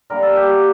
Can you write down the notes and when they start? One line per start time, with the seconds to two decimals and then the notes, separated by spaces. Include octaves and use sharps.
0.10 D3 G3 A#3 D4 A#4
0.23 A4
0.36 G4
0.49 F#4